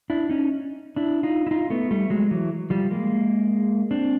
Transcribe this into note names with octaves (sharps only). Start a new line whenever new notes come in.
D4 E4
C#4 D#4
D4 E4
D#4 F4
E4
D#4 F4
A3 B3
G3 A3
F#3 G#3
E3 F#3
F3 G3
G#3 A#3
C4 D4